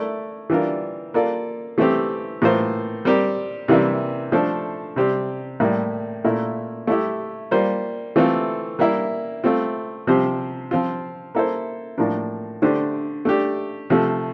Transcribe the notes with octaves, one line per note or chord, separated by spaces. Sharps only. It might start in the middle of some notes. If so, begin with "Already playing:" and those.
Already playing: A3 E4 A#4 D5
E3 G3 D4 F4 A#4
A#3 F4 A4 D5
E3 A3 C4 G4
A2 E3 A#3 F4 C5
G3 C4 G4 A#4
C3 E3 G3 A#3 E4
F3 A3 D4 A4 C5
C3 G3 C4 G4
A2 G3 A#3 E4
A#2 A3 E4 A#4
A3 E4 G4
G3 A#3 F4 C5
E3 A3 C4 F4 A4
G3 A#3 E4 A#4
A3 C4 F4
C3 F3 C4 G4 C5
F3 C4 F4
A#3 E4 A4 C5
A2 F3 A#3 D4
D3 A3 D4 G4 C5
A3 D4 G4
C3 F3 A3